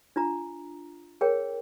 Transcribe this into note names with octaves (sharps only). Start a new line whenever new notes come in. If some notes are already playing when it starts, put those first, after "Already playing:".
D4 F4 A#5
G#4 A#4 C#5 G5